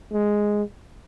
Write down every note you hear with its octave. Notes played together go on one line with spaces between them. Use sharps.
G#3